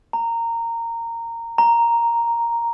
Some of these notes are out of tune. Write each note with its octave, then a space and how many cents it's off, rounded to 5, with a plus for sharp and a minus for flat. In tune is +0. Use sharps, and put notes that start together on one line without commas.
A#5 -15
A#5 +0